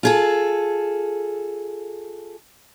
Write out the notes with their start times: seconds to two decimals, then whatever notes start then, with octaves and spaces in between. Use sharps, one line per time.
0.03 F4 G#4 A4